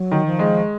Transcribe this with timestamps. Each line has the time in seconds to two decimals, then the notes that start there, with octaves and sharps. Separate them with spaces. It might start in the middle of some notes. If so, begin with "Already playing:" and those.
Already playing: F#3
0.11 D#3
0.26 F3
0.39 G#3